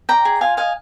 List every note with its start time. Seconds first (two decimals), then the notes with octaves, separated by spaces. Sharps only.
0.09 D5 G5 A#5
0.25 G#4
0.41 F4 F5 G#5
0.57 D#5 F5 G#5